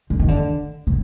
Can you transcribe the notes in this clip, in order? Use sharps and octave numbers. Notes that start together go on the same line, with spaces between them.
D3
D#3
D3
C#3